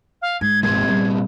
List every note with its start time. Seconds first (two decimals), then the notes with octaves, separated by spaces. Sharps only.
0.22 F5
0.41 G#2 G#6
0.63 G#1 F2 A#2 B3 C4 G#6
0.88 G3